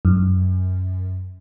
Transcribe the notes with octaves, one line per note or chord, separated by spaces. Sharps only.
F#2